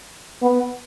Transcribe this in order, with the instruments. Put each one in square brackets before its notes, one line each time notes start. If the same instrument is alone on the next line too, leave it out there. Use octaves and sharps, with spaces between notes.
[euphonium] B3